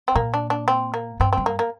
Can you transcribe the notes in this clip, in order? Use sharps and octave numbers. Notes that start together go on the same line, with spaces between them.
C4
A#2 A#3
D4
D4
C4
A#3
G2 C4
G2 C4
A#3
A#3